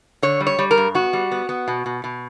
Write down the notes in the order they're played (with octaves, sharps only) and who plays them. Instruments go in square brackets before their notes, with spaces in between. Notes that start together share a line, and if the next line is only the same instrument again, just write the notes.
[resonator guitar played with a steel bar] D3 C#5
G3
C#5
G3
A#4
G2
B3 F#4
G3
B3
B3
B2
B2
B2